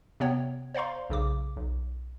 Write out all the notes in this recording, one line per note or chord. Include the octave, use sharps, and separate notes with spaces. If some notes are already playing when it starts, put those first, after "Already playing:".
C3 B3 C#5 G5
C5 D5 F5 A#5 C6
B1 C#3 D6
B1